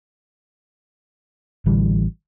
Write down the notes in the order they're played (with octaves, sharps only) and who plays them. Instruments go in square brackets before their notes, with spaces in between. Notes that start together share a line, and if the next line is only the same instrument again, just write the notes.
[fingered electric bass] A1 D3 E3 G3